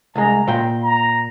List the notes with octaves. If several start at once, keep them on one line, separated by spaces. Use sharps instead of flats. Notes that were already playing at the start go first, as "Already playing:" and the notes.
C2 G#3 A#5
A#2 G5
A#5